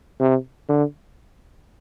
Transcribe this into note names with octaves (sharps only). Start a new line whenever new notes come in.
C3
D3